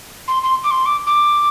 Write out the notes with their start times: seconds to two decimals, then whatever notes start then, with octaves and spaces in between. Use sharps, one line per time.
0.27 C6
0.42 C6
0.64 D6
0.70 C6
0.85 D6
1.06 D6